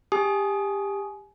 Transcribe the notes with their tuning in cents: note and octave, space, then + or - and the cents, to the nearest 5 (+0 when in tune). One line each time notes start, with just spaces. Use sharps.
G4 +25 G#5 +25 D#6 +0